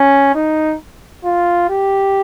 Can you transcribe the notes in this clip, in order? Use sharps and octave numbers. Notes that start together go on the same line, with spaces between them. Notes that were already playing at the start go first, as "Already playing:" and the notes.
Already playing: C#4
D#4
F4
G4